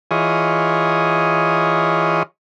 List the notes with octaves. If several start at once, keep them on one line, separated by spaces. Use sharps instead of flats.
E3 F4 G#4 C#5 D#5